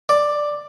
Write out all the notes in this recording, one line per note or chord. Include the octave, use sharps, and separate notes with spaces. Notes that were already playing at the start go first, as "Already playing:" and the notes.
D5